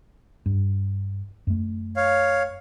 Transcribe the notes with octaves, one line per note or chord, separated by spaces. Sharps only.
G2
F#2 A3
C#5 F5